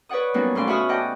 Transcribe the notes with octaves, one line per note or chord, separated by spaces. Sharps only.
B4 C#5 D5 F#5 D#6
F#3 G3 A#3 B3 C#4 D#4
D2 B2 C#4 F5 C6 D6
F#4 C#5 E5 B5 D#6 F6
D5 D#5 F#5 G5 A5 D6